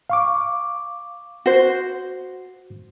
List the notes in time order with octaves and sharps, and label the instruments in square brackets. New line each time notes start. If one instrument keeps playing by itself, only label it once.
[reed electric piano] F5 C#6 D6
[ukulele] F#4 C5